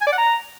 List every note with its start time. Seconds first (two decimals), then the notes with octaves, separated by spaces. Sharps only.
0.01 G#5
0.07 D5
0.12 F#5
0.18 A#5